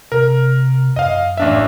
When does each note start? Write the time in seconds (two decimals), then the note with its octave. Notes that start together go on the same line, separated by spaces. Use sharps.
0.12 C3 A#4
0.96 F#2 D#5 F5
1.37 A1 D4 E5